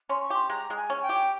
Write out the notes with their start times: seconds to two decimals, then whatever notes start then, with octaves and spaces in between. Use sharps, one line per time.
0.09 C#4 C6
0.22 C#6
0.30 G4 C6
0.50 G#3 A#5
0.70 G#3
0.76 G#5
0.90 C#4
1.03 G5
1.09 G4